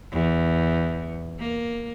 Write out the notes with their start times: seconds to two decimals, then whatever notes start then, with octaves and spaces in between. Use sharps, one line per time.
0.12 E2
1.40 A#3